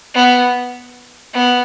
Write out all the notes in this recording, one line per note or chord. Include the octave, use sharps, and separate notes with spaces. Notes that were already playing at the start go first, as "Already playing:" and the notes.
B3
B3